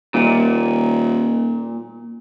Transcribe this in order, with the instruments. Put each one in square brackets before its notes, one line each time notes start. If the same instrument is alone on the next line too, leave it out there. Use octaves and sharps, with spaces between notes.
[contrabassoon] D#1 [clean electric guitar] A#2